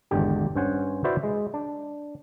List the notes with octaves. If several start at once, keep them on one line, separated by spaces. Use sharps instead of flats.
G#1 E2 D3 G4
G2 C#4 C5 F#5 G#5
E4 F#4 B4 C5 D5 E5
G#3
D4